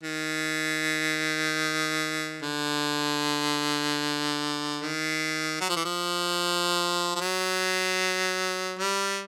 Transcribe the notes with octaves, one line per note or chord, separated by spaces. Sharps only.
D#3
D3
D#3
F#3
F3
E3
F3
F3
F#3
G3